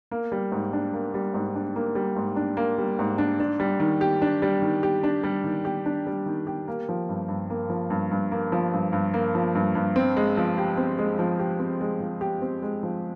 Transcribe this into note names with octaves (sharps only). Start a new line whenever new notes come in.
A#3
G3
G#2
D4
A#3
G3
G#2
D4
A#3
G3
G#2
D4
A#3
G3
G#2
D4
D4
G3
D#3
G4
D4
G3
D#3
G4
D4
G3
D#3
G4
D4
G3
D#3
G4
A#3
F3
G2
G2
A#3
F3
G2
G2
A#3
F3
G2
G2
A#3
F3
G2
G2
C4
G#3
F3
G4
C4
G#3
F3
G4
C4
G#3
F3
G4
C4
G#3
F3